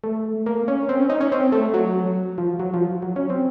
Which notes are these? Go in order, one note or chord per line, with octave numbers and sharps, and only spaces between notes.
A3
A#3
C#4
C4
C#4
D#4
C#4
C4
A3
F#3
F3
F#3
F3
F#3
C#4
C4